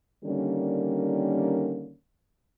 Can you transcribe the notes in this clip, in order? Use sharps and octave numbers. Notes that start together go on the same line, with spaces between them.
D3 D#3 G3 A#3 C#4